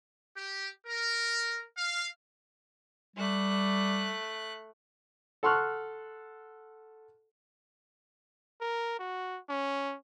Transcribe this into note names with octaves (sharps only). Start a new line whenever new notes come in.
G4
A#4
F5
G3 A3 F#6
A4 F#5 C6 C#6 F6 F#6
A#4
F#4
C#4